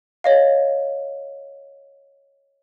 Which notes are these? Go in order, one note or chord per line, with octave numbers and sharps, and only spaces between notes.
C#5 D#5 F5